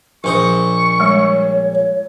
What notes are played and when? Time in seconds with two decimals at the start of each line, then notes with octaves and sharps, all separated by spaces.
0.24 A#1 C5 D#5 C#6
1.00 G3 G#3 C#5